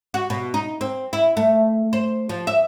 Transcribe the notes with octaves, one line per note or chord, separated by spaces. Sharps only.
F#4
B2
D#4
C4
E4
A3
C5
F3
E5